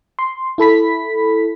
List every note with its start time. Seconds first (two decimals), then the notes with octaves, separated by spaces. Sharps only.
0.19 C6
0.58 E4 A4 B5 B6